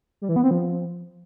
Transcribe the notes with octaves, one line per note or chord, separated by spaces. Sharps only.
G3
E3
B3
C4
F3